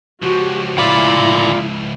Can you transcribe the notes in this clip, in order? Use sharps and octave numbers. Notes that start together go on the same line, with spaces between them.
C#2 F3 F#4 G4
D2 E4 F4 D5 B5